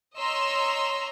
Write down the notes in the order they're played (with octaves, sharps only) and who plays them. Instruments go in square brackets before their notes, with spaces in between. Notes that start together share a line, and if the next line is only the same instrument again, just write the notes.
[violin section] C#5 D#5 A#5 C6 E6